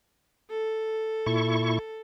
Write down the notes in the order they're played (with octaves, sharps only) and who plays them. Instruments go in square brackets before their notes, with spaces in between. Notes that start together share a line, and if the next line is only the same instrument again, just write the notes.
[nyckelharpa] A4
[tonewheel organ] A#2 E4 C#6